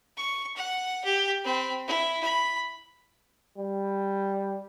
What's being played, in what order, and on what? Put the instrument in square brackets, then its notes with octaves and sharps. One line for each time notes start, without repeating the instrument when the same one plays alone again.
[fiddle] C#6
F#5
G4
C4 B5
E4
B5
[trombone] G3